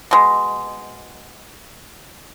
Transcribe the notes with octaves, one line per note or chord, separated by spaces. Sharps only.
B2 G#3